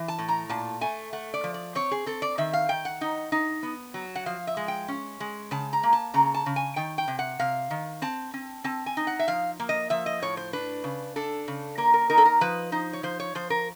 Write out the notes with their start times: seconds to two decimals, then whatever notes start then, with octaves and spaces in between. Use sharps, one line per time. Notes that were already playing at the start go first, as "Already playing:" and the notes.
Already playing: E3
0.08 A5
0.18 A2
0.28 A#5
0.49 A#2 A5
0.81 A3 G#5
1.13 A3 F#5
1.34 D5
1.44 F3
1.54 D5
1.75 C4 C#5
1.91 G#4
2.06 C4 A4
2.22 D5
2.38 D#3 E5
2.53 F5
2.69 D#3 G5
2.85 F#5
3.01 D#4
3.32 D#4
3.63 B3
3.94 F#3
4.15 F#5
4.26 F3 F5
4.47 E5
4.57 G#3
4.68 G5
4.88 C#4
5.20 G#3
5.51 C#3 A5
5.73 A#5
5.83 A#3
5.93 A5
6.14 C#3 A#5
6.34 A5
6.46 C#3
6.56 G#5
6.76 D#3 G5
6.98 G5
7.08 C3
7.19 F#5
7.40 C3 F5
7.71 D#3
8.02 C4 A5
8.34 C4
8.64 C4 A5
8.86 G#5
8.97 D#4
9.07 F#5
9.19 E5
9.28 F3 F5
9.60 A#3
9.69 D#5
9.90 F3 E5
10.06 D#5
10.22 A2 C#5
10.37 C5
10.53 D4 B4
10.84 C#3
11.16 D4 A4
11.48 C#3
11.78 A#3 A#4
11.94 A#4
12.10 D#4 A#4
12.18 A4
12.25 A#4
12.41 F3 B4
12.72 D#4 C5
12.93 C#5
13.03 F3 C5
13.20 C#5
13.35 F3 C5
13.50 A#4